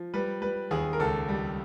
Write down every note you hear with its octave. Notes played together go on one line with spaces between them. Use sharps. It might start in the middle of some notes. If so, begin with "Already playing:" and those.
Already playing: F3
G3 B4
G3 B4
D#2 G#4
A#4
C#2 A4
G3